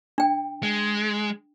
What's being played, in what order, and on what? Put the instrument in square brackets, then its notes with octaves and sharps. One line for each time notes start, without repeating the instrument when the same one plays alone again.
[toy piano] D4 G5
[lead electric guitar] G#3